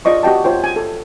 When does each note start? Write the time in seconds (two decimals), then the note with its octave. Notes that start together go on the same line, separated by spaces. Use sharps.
0.05 F4 D5 D#5 C#6
0.23 F#4 G4 D#5 G5 A5
0.44 F4 C5 C#5 G5
0.64 G#5
0.76 A4